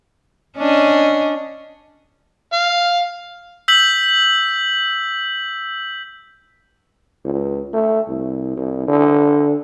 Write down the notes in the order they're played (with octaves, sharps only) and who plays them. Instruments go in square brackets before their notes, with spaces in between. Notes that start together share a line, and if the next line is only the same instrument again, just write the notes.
[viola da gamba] C#4 D4 D#5
[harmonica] F5
[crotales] E6 G6 B6 F#7
[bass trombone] C#2
A3
C2
C2
D3